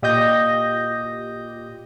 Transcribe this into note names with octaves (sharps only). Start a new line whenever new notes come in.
A#2 G4 D#5 D#6 G6 A#6